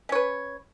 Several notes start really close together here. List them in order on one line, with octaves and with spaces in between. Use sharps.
C#4 C#5 B4